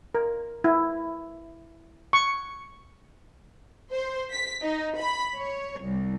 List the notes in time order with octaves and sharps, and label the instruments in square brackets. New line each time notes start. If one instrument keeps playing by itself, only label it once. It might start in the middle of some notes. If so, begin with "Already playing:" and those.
[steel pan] A#4
E4
C#6
[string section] C5
B6
D#4
B5
C#5
C2